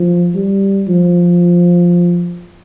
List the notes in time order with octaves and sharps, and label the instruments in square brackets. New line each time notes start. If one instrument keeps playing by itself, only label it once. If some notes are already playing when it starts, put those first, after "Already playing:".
Already playing: [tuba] F3
G3
F3